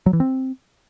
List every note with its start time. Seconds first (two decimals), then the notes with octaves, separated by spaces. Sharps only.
0.06 F#3
0.13 E3
0.20 C4